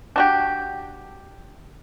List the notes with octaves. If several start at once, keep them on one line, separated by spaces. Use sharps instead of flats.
D4 F#4 G4